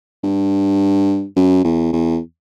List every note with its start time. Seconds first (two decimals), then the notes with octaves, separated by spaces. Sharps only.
0.24 G2
1.36 F#2
1.64 E2
1.93 E2